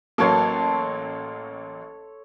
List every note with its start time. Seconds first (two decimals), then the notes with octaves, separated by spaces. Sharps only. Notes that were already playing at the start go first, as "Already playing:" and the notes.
0.18 A1 F#3 A#3 A4 C#5 C6